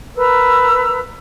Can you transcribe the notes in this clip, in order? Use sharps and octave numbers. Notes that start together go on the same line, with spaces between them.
A#4 B4 A#5 E6